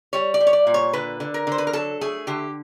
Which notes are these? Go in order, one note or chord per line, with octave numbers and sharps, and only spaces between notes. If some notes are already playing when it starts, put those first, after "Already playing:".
G3 C#5
D5
G3
C#5
D5
A#2
C#5
D3 B4
D3
A#4
D3 C5
B4
A#4
F#3 A4
A3 G#4
D3 G4